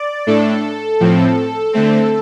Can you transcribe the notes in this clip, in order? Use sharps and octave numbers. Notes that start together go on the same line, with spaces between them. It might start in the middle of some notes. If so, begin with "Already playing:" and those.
Already playing: D5
A2 A3 D4 A4
A2 F3 C4
D3 A3 C4